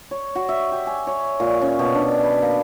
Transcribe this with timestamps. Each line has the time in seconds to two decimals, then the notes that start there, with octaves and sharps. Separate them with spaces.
0.11 C#5
0.35 F#4
0.49 E5
0.72 G4
0.87 G#5
1.07 C#5
1.40 A#2
1.62 C#4
1.79 B2
1.94 D4
2.23 B4
2.42 A#3